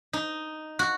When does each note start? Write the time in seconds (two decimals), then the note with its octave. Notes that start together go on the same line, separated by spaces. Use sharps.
0.13 D#4
0.79 F#4